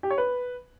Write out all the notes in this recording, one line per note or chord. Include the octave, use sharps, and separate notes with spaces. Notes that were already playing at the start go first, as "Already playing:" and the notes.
G4
C#5
B4